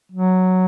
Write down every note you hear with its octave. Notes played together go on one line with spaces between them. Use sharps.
F#3